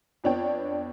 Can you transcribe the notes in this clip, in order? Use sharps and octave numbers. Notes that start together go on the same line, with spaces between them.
F2 B3 D4 C#5 G5